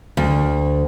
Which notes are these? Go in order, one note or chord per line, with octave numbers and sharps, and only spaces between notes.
D2